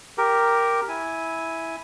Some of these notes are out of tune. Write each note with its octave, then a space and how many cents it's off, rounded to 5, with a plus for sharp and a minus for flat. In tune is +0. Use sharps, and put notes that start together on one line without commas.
G4 +0 A#4 +0
E4 -10 G#5 +0